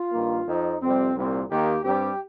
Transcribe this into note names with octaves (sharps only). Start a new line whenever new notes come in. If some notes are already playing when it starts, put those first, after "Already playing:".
Already playing: F4
G2 D#3 A#3
F2 F3 C4 D#4
F2 C3 G3 C4
C2 A#2 G3 C4
D#2 D#3 A#3 G4
G2 G3 C4 G4